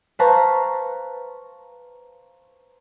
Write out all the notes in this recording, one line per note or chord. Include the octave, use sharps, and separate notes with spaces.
B4 C5 F5 A5 A#5 C#6